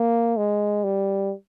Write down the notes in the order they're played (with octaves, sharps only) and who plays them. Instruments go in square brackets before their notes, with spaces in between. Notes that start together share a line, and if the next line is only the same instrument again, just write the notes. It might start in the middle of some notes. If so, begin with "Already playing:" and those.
Already playing: [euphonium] A#3
G#3
G3